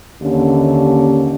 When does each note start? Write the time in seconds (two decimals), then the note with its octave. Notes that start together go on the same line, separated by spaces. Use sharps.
0.22 D#2 D3 C#4